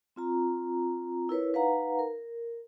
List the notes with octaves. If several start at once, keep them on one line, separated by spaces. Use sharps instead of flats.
C4 F4 A#5
E4 A#4 B4 C#5
D#4 B4 F5 F#5 A#5
A#4